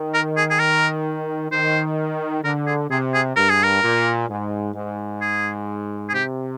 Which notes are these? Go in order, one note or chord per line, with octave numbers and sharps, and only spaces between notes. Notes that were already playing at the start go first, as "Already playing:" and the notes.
Already playing: D#3
A#4
G#4
G#4
A#4
D#3 C5
D3 A#4
G#4
C3 G#4
G#4
G2 A#4
G#4
A#4
A#2
G#2
G#2
G#4
G#4
C3 G4